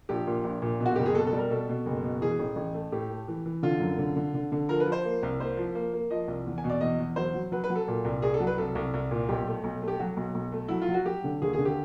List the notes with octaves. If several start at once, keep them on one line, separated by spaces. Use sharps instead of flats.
A#1 G4
A#2
A#1
A#2
B2
F#4
F#1 G4
G#4
B2 A4
A4
G3
A#4
B2 A4
B2
F#1
B2
E3 G#4
A1
A1
A3
A2 G4
A3
E3
E3
D3 F4
F#2
D3
D3
D3
D3
F3 A#4
B4
F3
C5
A#3
C2
A#3 C5
F3
A#3
A#3
F3 D#5
C2
E2
G#5
B2
D5
E2 D#5
E2
F#3 C5
F#3
F#3 B4
B4
F#3
A4
A#2
C2
C2 G#4
A4
F#3
B4
C2 A4
C2
C2
A#2
B1 G4
A3
B1
A3
G4
F#3 F#4
B1
B1
A3
F#3 E4
F4
F#3
F#4
F#3 G4
D3
D#2 G#4
G#4
D3
G4